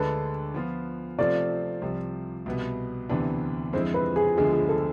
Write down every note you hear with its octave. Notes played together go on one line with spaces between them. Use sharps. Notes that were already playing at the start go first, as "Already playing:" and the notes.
Already playing: D2 D3 G#3 D4 A4 B4
F3 B3 F4
C3 F3 A3 C4 F4 D5
C2 C3 F3
C2 B2 B3
D2 C3 E3 B3 D4
F2 D3 G#3 C4 E4 C5
B4
G#4
D2 D3 F3 G#3 B3 G#4
G#4
A4